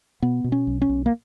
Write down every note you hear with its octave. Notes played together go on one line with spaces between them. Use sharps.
B2 B3
B2
C#4
B1
C#4
B1
A#3